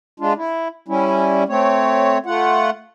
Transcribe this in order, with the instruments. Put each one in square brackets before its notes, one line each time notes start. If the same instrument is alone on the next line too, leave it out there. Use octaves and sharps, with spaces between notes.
[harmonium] G#3 D4 F4
E4
G3 C#4 E4
A3 C4 C#5
A3 F4 F#5